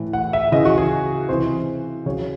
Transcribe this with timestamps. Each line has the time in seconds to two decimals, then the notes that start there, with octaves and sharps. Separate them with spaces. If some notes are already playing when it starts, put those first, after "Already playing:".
Already playing: A2 E3
0.13 F#5
0.33 E5
0.52 C#3 E3 D#5
0.65 F#4
0.78 G#4
1.28 C3 E3 C5
2.06 C#3 F#3 C#5